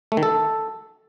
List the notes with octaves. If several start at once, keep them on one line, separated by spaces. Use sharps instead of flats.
A3
D#3
A4